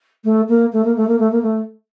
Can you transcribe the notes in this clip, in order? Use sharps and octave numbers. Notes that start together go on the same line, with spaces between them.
A3
A#3
A3
A#3
A3
A#3
A3
A#3
A3